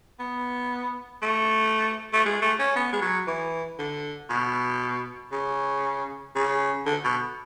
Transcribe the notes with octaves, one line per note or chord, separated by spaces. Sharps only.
B3
A3
A3
G#3
A3
C#4
B3
G#3
F#3
E3
D3
B2
C#3
C#3
D3
B2